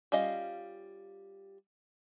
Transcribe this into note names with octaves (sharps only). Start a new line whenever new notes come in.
G3 C#4 F4 D#5 F5